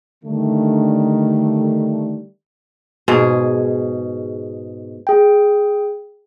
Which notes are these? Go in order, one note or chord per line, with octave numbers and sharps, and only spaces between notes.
D3 D#3 G3 A3
G#2 B2 G#4
G#4 G5